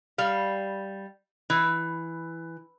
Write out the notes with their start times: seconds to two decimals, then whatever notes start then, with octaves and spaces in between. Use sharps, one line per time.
0.18 G3 F5
1.50 E3